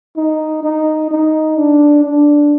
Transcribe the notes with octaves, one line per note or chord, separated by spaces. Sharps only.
D#4
D#4
D#4
D4
D4